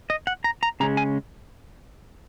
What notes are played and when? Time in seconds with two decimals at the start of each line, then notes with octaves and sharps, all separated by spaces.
0.10 D#5
0.27 F#5
0.44 A#5
0.63 A#5
0.80 C#3 G#3 C#4 A#5
0.97 G#5